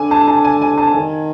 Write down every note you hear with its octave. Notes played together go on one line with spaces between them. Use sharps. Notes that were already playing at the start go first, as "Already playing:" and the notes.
Already playing: D3 G#5
A5
A5
G#5
G#5
A5
D#3 G#5